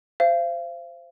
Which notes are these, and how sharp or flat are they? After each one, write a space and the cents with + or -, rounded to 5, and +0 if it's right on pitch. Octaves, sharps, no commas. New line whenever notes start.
C5 +0 F5 -40